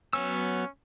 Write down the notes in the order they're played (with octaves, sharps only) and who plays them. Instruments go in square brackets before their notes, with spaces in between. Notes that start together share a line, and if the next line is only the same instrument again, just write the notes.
[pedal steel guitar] F#3 B3 E6 [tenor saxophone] C#4